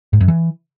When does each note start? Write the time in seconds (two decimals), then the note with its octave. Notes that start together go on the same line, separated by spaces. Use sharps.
0.13 G#2
0.21 F#2
0.28 E3